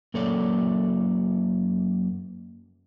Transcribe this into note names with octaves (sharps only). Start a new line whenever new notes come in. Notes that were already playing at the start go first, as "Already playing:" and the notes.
F#2 A#3 A4 C#5 D5